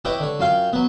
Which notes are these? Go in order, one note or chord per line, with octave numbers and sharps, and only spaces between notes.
E4 G4 B4 C#5 D#5 G5
D3 C#5
F#2 F4 F5 G5
F#3 B3